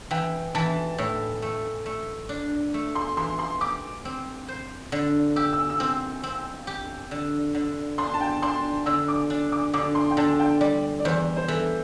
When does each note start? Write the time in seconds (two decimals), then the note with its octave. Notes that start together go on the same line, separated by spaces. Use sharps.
0.11 E3 G5
0.54 E3 A5
0.98 A2
1.42 A3
1.86 A3
2.29 D4
2.74 A3
2.95 C6
3.17 E3 C6
3.39 C6
3.61 G4 D6
4.05 C4
4.48 C5
4.92 D3
5.36 G4 E6
5.53 E6
5.70 E6
5.80 C4 E6
6.23 C4
6.67 G4
7.11 D3
7.55 D3
7.98 D4 C6
8.14 A5
8.21 G5
8.42 D4 C6
8.86 D3 E6
9.08 D6
9.30 D4
9.52 D6
9.74 D3 D6
9.95 C6
10.11 G5
10.17 D3 A5
10.40 G5
10.61 G3 D5
11.00 D5
11.05 E2 C5
11.37 C5
11.48 E3 A4